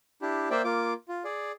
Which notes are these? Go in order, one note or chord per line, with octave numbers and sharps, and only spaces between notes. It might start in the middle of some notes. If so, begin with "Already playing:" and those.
D4 E4 G4
A#3 C5 D5 E5 G5
A#3 F4 D6
F4
G#4 D5